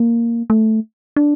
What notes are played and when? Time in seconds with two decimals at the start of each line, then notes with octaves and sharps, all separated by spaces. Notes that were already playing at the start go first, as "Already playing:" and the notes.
Already playing: A#3
0.50 A3
1.16 D4